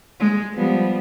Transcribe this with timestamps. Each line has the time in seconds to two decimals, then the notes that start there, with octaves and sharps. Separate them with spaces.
0.20 G#3
0.54 F3 G3 B3